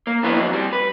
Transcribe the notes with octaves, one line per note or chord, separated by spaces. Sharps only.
A#3
F3 B3 D4 E4 B4
F2 D3 F#3
C3 G3
B4